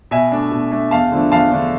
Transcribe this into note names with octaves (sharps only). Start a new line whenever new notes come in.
B2 E5 G#5
A3 D4
B2
A3 D4
E2 F5 A5
D3 F3 A3 D4
E2 F5 A5
D3 F3 A3 D4